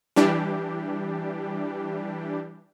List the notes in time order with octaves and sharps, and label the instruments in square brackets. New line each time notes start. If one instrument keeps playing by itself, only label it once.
[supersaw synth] E3 G3 D4 G4